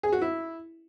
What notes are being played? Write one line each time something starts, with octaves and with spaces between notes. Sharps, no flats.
G#4
F#4
E4